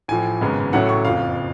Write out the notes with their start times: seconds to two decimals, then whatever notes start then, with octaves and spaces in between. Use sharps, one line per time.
0.08 A1 A2 F3 G#5
0.41 G#1 F#2 C#3 G#3 B3
0.73 A1 A2 F#3 A3 C#4 F#5
0.89 C#6
1.05 F#1 F2 F3 F5